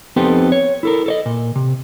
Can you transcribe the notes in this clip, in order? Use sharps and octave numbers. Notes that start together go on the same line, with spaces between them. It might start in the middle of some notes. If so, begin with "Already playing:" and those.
F2 B3 C4 D#4 G4 A4
C#5
E4 A4 A#4
A4 C#5 D#5
A#2
C3